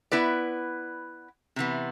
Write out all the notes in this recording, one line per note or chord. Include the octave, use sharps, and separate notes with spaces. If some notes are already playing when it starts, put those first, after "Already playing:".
B3 E4 B4 D5
C3 E3 B3